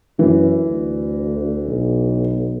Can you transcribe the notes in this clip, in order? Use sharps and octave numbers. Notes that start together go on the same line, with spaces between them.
F#2 E3
D2
B1